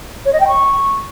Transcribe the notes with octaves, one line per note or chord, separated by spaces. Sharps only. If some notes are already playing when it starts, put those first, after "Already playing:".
C#5
D#5
G5
C#6